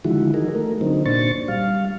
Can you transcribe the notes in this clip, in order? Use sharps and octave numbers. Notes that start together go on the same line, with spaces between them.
D3 D#3 F3 G#3 E4 F#4
D#4 G#4 A#4
A3 A#4
D3 F#3 C4 D#4
A#2 D4 C5 C#6 A6
G3 F5